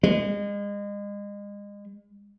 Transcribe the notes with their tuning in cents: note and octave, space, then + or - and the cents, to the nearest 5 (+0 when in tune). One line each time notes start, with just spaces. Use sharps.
G#3 -35